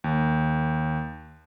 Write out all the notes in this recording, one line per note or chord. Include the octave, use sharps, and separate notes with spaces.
D#2